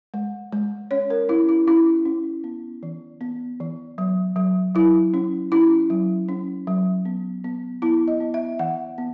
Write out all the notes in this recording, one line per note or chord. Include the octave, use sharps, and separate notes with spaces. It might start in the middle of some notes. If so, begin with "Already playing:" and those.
G#3
G#3
C#4 C#5
A#4
C#4 E4
E4
C#4 E4
C#4
B3
E3
B3
E3
F#3
F#3
F#3 E4
C#4
C#4 E4
F#3
C#4
F#3
B3
B3
B3 E4
D#5
B3
E5
E3 F#5
B3